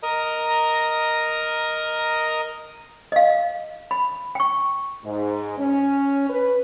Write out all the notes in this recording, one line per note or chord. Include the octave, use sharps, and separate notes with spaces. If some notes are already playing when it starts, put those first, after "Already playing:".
A#4 D#5 A#5
D#5 F5
B5
G5 C#6
G#2
C#4
B4